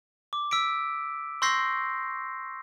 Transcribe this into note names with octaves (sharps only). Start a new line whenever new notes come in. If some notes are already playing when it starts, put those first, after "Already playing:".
D6
E6 B6 D7
C6 C#6 E6 G6 A#6 C7